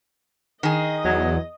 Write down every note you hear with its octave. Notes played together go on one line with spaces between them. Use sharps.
D#3 G#4 D#5
E2 F#3